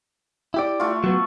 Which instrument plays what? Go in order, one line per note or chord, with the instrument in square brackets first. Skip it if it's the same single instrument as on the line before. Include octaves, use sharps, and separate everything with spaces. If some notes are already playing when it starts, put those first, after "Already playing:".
[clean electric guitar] E4 G4 D5
[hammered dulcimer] A3 F4
[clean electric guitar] F#3 B3